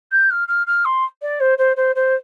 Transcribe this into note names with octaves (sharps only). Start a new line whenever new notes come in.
G6
F6
F6
F6
C6
D5
C5
C5
C5
C5